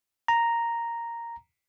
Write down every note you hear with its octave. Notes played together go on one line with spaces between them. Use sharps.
A#5